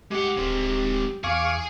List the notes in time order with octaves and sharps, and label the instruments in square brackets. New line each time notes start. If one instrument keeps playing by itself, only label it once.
[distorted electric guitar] G#3 F#5 [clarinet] G4
[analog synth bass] D1 [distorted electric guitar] G#3 C4
[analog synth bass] E2 [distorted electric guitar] G#4 [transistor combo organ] F5 C#6 D6